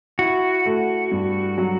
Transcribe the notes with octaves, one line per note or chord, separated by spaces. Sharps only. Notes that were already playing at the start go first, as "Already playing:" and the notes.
E4 F#4
A3
G2
F#3